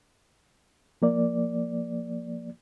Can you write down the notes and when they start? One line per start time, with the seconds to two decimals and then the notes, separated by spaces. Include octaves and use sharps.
1.02 F3 A#3 D5